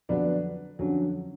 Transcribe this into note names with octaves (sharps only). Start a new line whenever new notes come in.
F2 D3 F#3 B3 D4 B4 D5
F2 D3 F#3 C#4